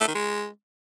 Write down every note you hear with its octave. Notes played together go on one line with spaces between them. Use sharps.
A3
D#3
G#3